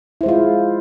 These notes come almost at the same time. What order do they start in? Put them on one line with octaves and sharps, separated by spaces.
E4 C5 G#3 F4